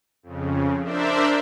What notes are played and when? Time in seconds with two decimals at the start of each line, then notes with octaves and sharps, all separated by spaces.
0.23 F2 C#3
0.83 D4 A#4 C5 D5 E5